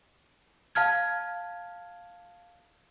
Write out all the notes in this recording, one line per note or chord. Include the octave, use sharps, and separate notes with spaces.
F5 A5 F6 G#6